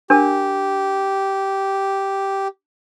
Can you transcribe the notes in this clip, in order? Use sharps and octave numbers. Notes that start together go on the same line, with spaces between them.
D4 G4 A#4